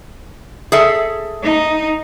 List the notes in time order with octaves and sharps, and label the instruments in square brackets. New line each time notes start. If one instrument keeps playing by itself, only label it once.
[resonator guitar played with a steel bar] G#4 A4 E5
[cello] D#4